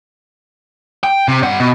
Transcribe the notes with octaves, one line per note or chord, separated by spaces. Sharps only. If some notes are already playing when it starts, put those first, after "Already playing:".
G5
C3
G2 F#5
B2